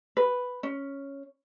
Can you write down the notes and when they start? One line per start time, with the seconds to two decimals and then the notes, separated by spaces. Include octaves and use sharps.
0.17 B4
0.63 C#4